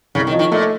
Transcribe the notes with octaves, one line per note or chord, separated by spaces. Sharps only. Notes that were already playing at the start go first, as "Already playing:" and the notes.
C2 C#3
D#3
F3
D#3
A#2 A3